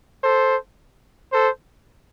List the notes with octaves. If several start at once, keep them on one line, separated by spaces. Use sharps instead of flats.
A4 C5
A4 C5